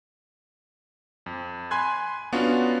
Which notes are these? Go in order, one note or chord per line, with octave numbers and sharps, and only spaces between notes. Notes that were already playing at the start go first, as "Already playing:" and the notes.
F2
G#5 B5 C6 F#6 G#6
B3 C#4 D4 F4 F#4